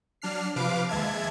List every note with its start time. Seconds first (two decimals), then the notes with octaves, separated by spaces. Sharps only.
0.22 F#3 D4 F6 C7
0.56 C3 F3 B4 F5 D6 D7
0.89 D#2 G#3 E5 A5 G#6